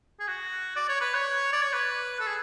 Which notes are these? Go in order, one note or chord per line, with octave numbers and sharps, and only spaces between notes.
G#4
F#4
D5
C#5
B4
C#5
D5
C#5
B4
A4
G#4